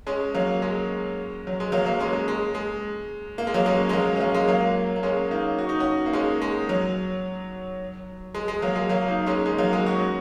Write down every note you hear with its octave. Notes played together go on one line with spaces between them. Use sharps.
G#3 C#4
F#3 A#3
G#3 C#4
F#3
G#3
F#3 A#3
F#3 A#3
G#3 C#4
G#3
G#3
G#3
A#3
G#3
F#3 A#3
G#3 C#4
G#3
F#3 A#3
C#4
F#3 A#3
G#3
F#3 A#3
A#3
G#3 C#4
A#3 D#4
F#4
D#4
C#4 F#4
A#3
G#3 C#4
G#3
F#3
G#3
G#3
F#3 A#3
G#3
F#3 A#3
A#3 D#4
G#3 C#4
G#3 C#4
F#3 A#3
G#3
C#4 F#4